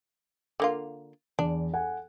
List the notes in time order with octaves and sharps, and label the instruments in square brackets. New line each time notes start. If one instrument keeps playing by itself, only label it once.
[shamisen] D3 A#3 F4
[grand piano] E2 [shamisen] D4
[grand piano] A4 F#5 G#5